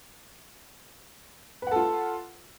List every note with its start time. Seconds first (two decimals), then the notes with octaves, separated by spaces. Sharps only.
1.62 B4
1.67 F#5
1.71 A4
1.76 F4